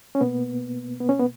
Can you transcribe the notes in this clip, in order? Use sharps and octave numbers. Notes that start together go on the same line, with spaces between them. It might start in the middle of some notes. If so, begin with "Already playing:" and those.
C#4
B2 A#3 B3
B3
C#4
B3